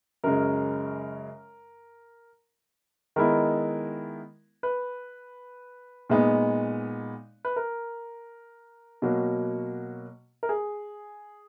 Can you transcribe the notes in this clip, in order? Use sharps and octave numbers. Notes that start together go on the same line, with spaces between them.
F#2 C#3 G#3 A#4
D#3 G#3 B3 E4 A#4
B4
A#2 G#3 B3 D#4
B4
A#4
B2 F#3 A#3
A#4
G#4